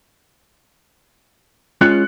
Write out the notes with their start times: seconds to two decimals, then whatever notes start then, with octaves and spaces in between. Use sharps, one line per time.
1.81 G#3 C#4 F4 F#6 C#7